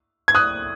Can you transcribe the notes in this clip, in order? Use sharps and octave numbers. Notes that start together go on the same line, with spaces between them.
G#6
D#6 F#6